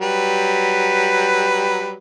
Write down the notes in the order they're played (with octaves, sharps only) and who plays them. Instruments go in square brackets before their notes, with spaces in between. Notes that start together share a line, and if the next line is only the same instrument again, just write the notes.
[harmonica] F#3 G3 B4